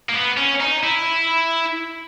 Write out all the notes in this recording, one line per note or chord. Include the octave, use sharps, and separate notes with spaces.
A#3
B3
C#4
D#4
E4